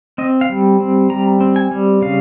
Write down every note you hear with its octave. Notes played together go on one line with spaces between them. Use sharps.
C4 D#5
F5
G3
C4
G3 A#5
C4
G#5
G3
C#3 F5